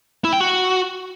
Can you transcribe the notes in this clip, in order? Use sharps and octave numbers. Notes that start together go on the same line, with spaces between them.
E4
G5
F#4